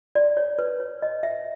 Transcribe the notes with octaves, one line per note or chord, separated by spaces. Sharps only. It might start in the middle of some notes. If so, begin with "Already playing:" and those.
D5
C#5
B4
C#5
D#5
E5